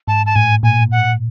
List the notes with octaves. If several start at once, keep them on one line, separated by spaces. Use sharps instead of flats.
G#2 A5
A5
A2 G#5
A#2 G#5
F#5